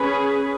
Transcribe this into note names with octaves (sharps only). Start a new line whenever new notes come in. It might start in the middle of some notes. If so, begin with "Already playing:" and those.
Already playing: C#4 G#4 B4